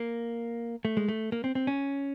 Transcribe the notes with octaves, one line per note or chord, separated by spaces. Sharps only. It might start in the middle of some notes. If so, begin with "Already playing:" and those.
Already playing: A#3
A3
G#3
A3
A#3
C4
C4
C#4